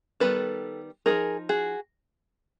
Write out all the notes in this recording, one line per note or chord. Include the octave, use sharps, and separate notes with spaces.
D#3 G3 B3 A4 B4
F3 A#3 D#4 G#4 A#4
F#4 G#4